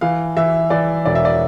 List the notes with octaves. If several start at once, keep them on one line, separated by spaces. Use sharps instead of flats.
E3 F5
E3 E5
E3 D5
E1 D5
E5
D5